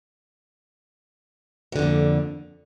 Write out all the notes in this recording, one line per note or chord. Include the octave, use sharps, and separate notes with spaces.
F2 A#2 D3 F#3